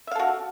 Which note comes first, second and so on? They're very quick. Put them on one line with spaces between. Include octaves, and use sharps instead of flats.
E5 F5 A4 F#4